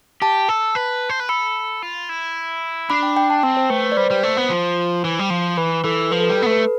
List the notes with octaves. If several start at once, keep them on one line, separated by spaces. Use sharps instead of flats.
G4 A5
A4
B4
C5
B4
A4 B5
F4
E4
D4 B5
G5
G5
A5
C4 G5
C5
A3 B4
B4
D5
G3 C5
G3
A3 C5
B3
F3
E3
G3
F3
E3 B4
E3 A4
F3 B4
A4
B4
G3
B3 A4
A3
B4